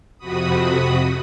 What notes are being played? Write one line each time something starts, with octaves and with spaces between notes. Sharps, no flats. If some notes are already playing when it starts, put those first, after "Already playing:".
F2 C3 F#4 B5 D#6